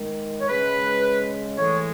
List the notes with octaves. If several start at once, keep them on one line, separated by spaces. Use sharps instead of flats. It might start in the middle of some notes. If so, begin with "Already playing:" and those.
Already playing: D#3 G#3
C#5
C#3 G#3 B4
A2 E3 G#3 C#5